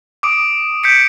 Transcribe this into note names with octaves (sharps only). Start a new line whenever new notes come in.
D6 D#6 D7
G6 B6 C#7 D7